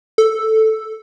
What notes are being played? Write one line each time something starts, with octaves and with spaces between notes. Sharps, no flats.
A4